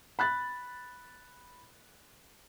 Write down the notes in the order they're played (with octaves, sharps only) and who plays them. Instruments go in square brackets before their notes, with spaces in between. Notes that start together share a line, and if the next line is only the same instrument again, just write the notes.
[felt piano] B5 F#6 A6